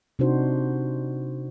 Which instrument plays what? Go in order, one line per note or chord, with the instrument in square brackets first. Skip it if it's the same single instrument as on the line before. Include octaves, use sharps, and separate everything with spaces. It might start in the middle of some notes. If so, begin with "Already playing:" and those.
[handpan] C3 D4 D#4 F#4 C5